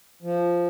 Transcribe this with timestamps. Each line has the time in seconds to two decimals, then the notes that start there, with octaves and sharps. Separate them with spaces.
0.22 F3